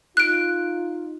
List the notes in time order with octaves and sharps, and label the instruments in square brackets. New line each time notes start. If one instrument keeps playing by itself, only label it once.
[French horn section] D#4 F4 [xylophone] F#6 D7